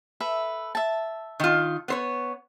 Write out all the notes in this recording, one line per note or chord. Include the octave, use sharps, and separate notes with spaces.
A4 B4 E5
E5 A5
D#3 F4
B3 C5 C#5